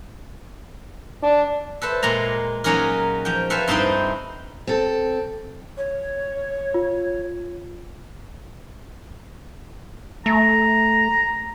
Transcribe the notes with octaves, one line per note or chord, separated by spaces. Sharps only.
D4
A4 B4 C5 E5
A#2 G#3 A#3 A#5
F#3 A#3 C#4 D#4 G#4 A#4
F3 G5
A4 B4 C5 E5 F5 G#5
G2 C4 D#4 E4 C5 G5
C4 A4
C#5
F4
A3 A#5